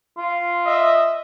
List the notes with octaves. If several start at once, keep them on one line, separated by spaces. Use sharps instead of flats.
F4
D#5 E5